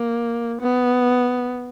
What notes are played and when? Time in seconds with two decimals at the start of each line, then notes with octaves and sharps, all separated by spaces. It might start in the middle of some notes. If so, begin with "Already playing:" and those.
Already playing: A#3
0.62 B3